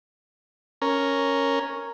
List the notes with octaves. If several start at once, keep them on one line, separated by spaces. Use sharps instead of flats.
C#4 A#4